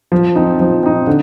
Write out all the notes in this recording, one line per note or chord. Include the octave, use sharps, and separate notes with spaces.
F3
C4 D#4
F3
C4 D#4
D3